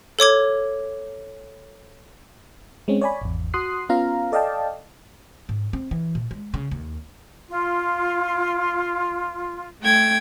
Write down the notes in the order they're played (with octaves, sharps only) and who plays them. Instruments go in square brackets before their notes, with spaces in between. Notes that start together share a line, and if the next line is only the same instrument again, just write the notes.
[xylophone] A4 C#5 D6 G#6
[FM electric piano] G#3 C4 C#4
C#5 D5 G#5 B5
G#1 E2
F#4 C6 D#6 F#6 C7
B3 C#4 F4 F5 A#5
A4 D5 D#5 F5 G5 A5
[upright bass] G#2
C4
E3
A#2
G#3
C#3
D#2
[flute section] F4
[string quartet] A3 G5 G#6